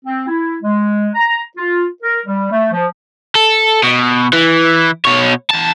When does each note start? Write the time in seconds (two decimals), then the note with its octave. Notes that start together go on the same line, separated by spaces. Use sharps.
0.05 C4
0.27 E4
0.63 G#3
1.15 A#5
1.57 F4
2.03 A#4
2.26 G3
2.52 A3
2.72 F3
3.35 A4
3.83 B2
4.33 E3
5.05 B2 C#5
5.50 E2 A5